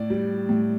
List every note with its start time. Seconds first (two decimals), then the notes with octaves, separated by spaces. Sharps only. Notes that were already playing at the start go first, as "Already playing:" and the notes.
Already playing: A2 D5
0.10 G3
0.49 A2